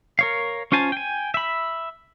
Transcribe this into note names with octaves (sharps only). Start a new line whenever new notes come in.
A#4 C#5 F5
C#4 F4 C5 G#5 A5
G5 G#5
E5 B5